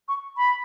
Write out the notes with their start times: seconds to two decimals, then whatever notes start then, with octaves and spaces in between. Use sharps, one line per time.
0.08 C#6
0.37 B5